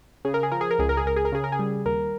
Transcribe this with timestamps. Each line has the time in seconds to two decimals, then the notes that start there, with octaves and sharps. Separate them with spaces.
0.25 C#3 G#4
0.34 A#4
0.43 G#4
0.52 F3 A#4
0.61 G#4
0.71 A#4
0.79 C#2 G#4
0.89 A#4
0.97 G#4
1.05 C#2 A#4
1.16 G#4
1.25 A#4
1.32 C#3 G#4
1.44 A#4
1.52 G#4
1.59 G3
1.85 D#2 A#4